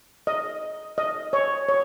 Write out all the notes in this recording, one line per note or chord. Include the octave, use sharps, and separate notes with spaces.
D#5
D#5
C#5
C#5